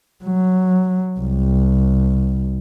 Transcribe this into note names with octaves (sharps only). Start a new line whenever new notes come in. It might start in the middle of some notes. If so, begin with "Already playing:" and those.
F#3
C2